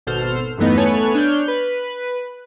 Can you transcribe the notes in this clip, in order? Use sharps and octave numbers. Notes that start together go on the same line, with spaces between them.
G#1 B2 A4 C5 F6
E2 G2 E3 A3 B3 D#4
A3 B3 A4 B4 C#5 G#5
D4 C#5 F6 G6
B4